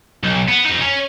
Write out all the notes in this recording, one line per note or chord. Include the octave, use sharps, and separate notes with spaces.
B1
B3
F2 D#4
C#4